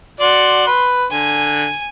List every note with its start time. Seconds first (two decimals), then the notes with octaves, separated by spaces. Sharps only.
0.20 F#4 D5 C6
0.67 B4
1.11 D3 G#5